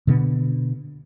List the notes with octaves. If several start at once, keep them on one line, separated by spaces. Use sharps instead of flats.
B2 D3 B3